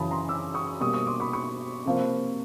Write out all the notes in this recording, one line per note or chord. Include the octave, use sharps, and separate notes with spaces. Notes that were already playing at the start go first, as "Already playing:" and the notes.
Already playing: F#2 C#3 E3 A5 B5 D#6
A#5 C6
D6 E6
C#6 D#6
B2 G3 A#3 C#6 D#6
C#6 D#6
C6 D6
B5 C#6
B5 C#6
C3 F3 A#3